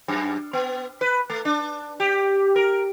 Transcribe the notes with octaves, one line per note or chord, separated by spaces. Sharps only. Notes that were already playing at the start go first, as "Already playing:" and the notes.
F#2
B3
B4
A3
D4
G4
A#4